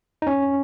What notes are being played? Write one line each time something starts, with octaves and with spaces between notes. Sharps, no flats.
D#4
C#4